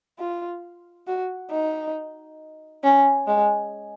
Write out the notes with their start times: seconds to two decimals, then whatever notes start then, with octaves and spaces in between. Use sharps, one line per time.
0.19 F4
1.07 F#4
1.51 D#4
2.84 C#4
3.27 G#3